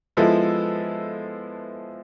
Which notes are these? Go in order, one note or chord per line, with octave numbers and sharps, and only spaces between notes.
F3 G#3 B3 E4 A4